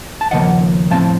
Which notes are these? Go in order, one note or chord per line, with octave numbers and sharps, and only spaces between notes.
A5
D#2 C#3 F3 A#3 D#5 F#5
A2 F3 C4 F5 A5